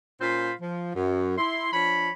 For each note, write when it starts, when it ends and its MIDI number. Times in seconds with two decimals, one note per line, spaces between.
0.21 0.53 46
0.21 0.53 61
0.21 0.53 65
0.21 0.53 72
0.21 0.53 77
0.21 0.53 83
0.62 0.95 53
0.95 1.34 42
1.38 1.73 64
1.38 1.73 84
1.73 2.11 53
1.73 2.11 62
1.73 2.11 73
1.73 2.11 83